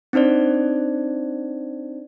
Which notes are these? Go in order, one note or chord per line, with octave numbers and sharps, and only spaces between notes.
C4 D4 D#4 C5 D5